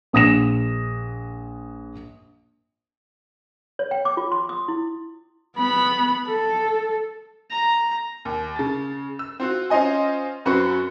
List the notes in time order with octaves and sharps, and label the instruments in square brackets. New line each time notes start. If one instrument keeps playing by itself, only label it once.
[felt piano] A#1 D#6 A#6 E7
[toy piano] C#5
G5
D6
F4
C6
D#6
E4
[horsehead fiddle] B3 B5
A4
[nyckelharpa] A#5
[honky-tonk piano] D#2
C#3 A6
E6
C4 F4 F#4
C#4 F4 C5 D#5 G#5
F#2 C4 F#4 B4 C#6 C#7